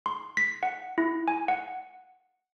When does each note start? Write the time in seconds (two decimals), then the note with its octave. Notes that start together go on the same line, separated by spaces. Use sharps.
0.06 C6
0.37 B6
0.63 F#5
0.98 E4
1.28 G#5
1.48 F#5